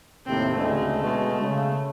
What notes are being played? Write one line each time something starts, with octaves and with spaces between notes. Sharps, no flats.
D#2 A2 C3 C4
D2 C#3 G#3 A3
B2 G#3
C#3